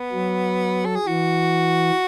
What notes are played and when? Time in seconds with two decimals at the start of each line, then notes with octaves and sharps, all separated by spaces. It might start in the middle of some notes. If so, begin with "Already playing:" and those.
Already playing: B3
0.12 F#3
0.85 A4
0.96 G#4
1.06 E3 F#4